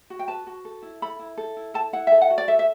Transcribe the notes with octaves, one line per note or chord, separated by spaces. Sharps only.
F#4
G5
B4 A5
F#4
A4
E4
A4 B5
E4
A4
E4
A4 A5
E4 F#5
A4 E5
F#5
F#4
D5
A4 E5
E5